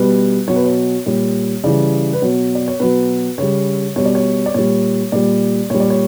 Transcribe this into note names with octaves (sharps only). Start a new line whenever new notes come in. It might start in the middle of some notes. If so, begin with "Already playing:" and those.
Already playing: B2 G3 B4
B2 F#3 C#5
B4
C#5
A#2 G3 C#5
C#3 E3 G3 D5
B4
B2 F#3 C#5
D5
C#5
B2 F#3 B4
C#3 G3 C#5
B2 G3 C#5
D5
C#5
D5
A#2 G3 C#5
A#2 G3 D5
A#2 G3 C#5
D5
C#5